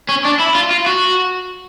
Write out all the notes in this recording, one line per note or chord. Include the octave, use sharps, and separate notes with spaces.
C#4
D4
E4
F4
F4
F#4